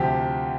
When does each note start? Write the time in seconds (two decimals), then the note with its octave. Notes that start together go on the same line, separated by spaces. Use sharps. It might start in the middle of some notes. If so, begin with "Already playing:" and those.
Already playing: D2 C3 F3 G4